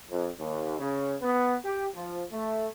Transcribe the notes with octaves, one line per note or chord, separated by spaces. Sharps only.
F2
D#2
C#3
B3
G4
F3
A3